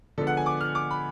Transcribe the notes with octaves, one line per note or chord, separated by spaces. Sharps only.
D3 F3 G#3 B3 D4 A4
F#5
G#5
D6
F6
D6
B5